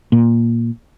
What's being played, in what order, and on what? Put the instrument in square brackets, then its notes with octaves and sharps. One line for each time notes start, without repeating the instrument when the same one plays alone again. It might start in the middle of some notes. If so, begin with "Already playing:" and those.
[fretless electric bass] A#2